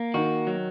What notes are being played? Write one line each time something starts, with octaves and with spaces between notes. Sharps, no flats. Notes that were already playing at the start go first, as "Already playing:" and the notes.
Already playing: A#3
D#3 F#4
F#3